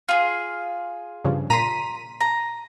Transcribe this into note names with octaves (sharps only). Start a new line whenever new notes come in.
F4 G#4
G2 C#3 F3
A#2 A#5 C6 B6 D#7
A#5